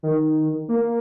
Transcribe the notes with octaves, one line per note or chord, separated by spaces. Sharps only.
D#3
A#3